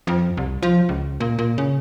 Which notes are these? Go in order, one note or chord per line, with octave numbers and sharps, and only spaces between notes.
F2
C2
F3
C#2
A#2
A#2
C#3